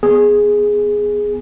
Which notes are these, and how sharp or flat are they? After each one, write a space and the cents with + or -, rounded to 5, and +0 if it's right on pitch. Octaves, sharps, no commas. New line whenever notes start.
B3 +0 G#4 +0